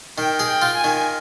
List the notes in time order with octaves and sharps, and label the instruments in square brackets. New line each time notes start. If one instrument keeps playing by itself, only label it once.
[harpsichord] D#3 [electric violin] G5
[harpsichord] G#4
[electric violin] G5
[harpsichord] F4
[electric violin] G#5
[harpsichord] D#3